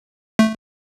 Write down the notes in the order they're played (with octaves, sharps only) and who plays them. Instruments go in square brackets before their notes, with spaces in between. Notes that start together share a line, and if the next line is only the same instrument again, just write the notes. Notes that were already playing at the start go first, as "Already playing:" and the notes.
[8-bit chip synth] A3